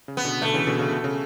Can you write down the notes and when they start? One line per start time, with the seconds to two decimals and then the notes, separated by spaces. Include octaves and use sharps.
0.08 C#3
0.17 B3
0.25 B2 D3
0.41 B2 D3 A3
0.54 C#3 E3
0.67 B2 D3
0.79 C#3
0.92 B2
1.04 C#3